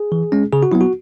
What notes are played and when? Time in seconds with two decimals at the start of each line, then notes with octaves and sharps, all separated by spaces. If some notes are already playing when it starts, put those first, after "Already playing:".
Already playing: G#4
0.12 E3
0.32 G#3 C#4
0.53 C#3 G#4
0.63 F#4
0.72 F#3 B3 E4
0.81 F#4